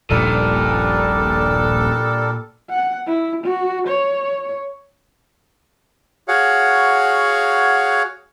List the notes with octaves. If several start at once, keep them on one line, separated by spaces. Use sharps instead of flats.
D#1 A#1 G2 A#2 G3 D4 A4 A#4
F#5
E4
F#4
C#5
F#4 G#4 C#5 F5 F#5